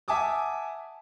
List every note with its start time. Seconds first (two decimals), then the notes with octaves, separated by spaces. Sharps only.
0.08 E5 F#5 G#5 A5 D6 D#6